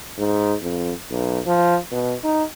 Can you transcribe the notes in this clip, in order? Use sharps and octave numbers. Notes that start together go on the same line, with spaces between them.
G#2
F2
B1
F3
B2
D#4